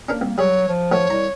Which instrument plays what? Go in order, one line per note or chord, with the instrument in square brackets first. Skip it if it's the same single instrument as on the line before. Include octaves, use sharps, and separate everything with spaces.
[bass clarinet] A#3 [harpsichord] C#4 D4 A#4
[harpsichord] C2
[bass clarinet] F#3 [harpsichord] G3 G#4 [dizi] C#5
[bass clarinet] F3
[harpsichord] D#3 F#3 A3 [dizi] C#5
[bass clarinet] C2 [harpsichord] A#5